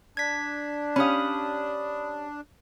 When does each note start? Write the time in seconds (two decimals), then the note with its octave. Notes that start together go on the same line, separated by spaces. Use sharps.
0.17 D4 G#6 B6
0.96 C#4 G4 F5 B5 D#6